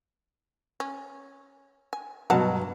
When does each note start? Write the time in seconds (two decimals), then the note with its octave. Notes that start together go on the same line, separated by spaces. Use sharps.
0.80 C#4
1.93 G#5
2.30 G2 B2 F#3 F5 F#5 A5